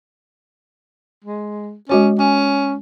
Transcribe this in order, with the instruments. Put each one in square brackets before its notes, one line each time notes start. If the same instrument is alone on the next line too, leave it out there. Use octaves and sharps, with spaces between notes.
[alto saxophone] G#3
[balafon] G#3 F#4 C#5 [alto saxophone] C#4
[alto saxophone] C#4 [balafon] G#5